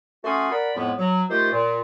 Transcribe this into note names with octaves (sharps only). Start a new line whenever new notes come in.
A3 C#4 F#4 F#5 C6 D#6
A#4 D5 F#5 B5
F2 A2 G#3 B3
F#3
D#3 A3 F4 G4 C5
A#2